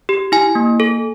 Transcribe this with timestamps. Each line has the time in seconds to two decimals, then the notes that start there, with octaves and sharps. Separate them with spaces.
0.09 G4
0.32 E4 G#5
0.55 A#3
0.80 A4